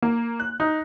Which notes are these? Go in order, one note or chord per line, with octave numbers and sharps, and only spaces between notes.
A#3
F#6
D#4